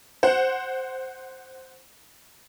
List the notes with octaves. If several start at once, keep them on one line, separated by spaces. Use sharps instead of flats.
C5 F#5